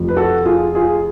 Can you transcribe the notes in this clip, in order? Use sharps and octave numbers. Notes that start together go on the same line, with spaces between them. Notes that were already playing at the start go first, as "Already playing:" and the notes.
Already playing: F1 F2 F3
B4
F#4 A4
F4 G#4
F4 G#4